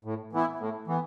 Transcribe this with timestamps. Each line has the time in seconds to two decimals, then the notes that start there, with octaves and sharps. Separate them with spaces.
0.04 A2
0.33 E3 B3 E4
0.60 A2
0.87 E3 B3